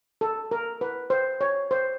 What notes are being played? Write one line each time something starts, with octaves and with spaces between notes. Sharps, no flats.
A4
A#4
B4
C5
C#5
C5